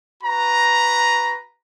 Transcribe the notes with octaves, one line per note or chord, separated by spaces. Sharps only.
F#4 B4 A#5